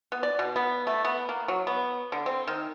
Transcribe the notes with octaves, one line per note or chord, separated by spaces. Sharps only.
B3
D5
B2
B3
A3
B3
A#3
F#3
B3
D3
C4
D#3